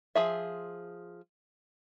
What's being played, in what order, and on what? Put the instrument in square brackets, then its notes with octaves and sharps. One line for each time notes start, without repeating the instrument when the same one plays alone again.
[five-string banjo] F3 G#4 E5